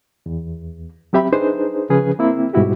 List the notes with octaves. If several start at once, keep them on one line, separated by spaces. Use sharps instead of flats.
E2
F#3 C4 G4 E5 B5
D4 D#4 G#4 B4 C5
C#3 F3 C#4 G#4 B4
A#3 C4 E4
G#2 B2 G3 E4 F#4 G4